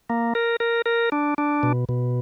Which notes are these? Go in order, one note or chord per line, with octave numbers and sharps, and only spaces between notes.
A#3
A#4
A#4
A#4
D4
D4
B2
B2